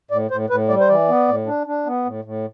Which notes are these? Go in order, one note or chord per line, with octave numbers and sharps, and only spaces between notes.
A2 D5
A2 C5
A2 B4
G3 D5
C5
E3 D5
B3
A2
D4
D4
B3
A2
A2